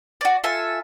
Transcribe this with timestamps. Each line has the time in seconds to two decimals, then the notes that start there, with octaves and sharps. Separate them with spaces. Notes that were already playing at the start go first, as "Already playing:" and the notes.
0.21 F#4 D5
0.44 F4 A4 E5 G#5